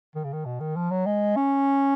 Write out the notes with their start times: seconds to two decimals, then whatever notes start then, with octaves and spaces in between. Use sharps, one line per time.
0.15 D#3
0.24 C#3
0.33 D#3
0.45 B2
0.60 D#3
0.76 F3
0.91 F#3
1.06 G#3
1.36 C#4